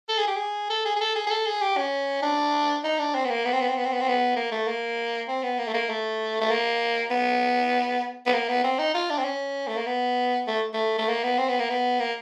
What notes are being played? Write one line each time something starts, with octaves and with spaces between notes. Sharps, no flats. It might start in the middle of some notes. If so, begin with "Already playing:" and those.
A4
G#4
G4
G#4
A4
G#4
G#4
A4
G#4
G#4
A4
G#4
G4
C#4
D4
D#4
D4
C4
B3
A#3
B3
C4
B3
C4
B3
C4
B3
C4
B3
A#3
A3
A#3
C4
B3
A#3
A3
A#3
A3
A3
A#3
B3
B3
A#3
B3
C4
D#4
F4
D4
C4
C#4
A3
A#3
B3
A3
A3
A3
A#3
B3
C4
B3
A#3
B3
A#3